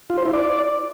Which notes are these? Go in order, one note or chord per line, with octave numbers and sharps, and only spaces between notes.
F4
C5
E4
D5